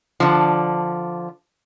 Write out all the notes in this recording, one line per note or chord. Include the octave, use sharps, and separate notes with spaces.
D3 F3